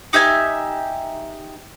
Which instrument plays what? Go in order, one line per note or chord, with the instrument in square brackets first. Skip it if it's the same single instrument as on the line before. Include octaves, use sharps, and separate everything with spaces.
[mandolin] D#4 G4 E5 G#5